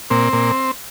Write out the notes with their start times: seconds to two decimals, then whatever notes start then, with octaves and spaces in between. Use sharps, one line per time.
0.10 A#2 C4
0.33 A#2